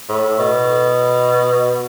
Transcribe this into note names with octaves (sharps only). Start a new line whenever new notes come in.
A2
B2